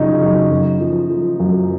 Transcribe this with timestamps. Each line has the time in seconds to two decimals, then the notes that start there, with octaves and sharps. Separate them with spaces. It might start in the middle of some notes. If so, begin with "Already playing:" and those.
Already playing: F#2 C#3 F3 C#4 D#4
0.21 F#2
0.51 F#2
0.80 F3
1.10 F3
1.40 F#2